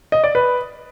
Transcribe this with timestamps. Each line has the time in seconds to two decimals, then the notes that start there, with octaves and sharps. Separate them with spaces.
0.12 D#5
0.24 D5
0.35 B4